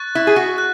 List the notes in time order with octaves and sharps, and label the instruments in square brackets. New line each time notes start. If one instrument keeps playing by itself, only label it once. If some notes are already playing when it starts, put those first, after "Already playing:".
Already playing: [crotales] C#6 F#6 A6
[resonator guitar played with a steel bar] E4
G#4
F#4
[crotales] F#6